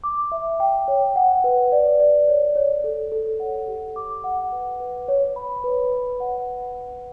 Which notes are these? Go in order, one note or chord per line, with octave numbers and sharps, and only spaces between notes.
D6
E5
G5
C#5
F#5
B4
D5
D5
C#5
C#5
A4
A4
F#5
G4
D6
F#5
B4
B4
C#5
B5
B4
B4
F#5